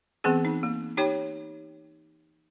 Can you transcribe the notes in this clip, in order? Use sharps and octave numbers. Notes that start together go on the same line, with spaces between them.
E3 B3 C4 G#4
D#4
A#3
D#4 G4 C#5 G5